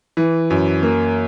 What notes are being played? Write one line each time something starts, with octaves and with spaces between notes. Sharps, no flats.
E3
F#2
A#3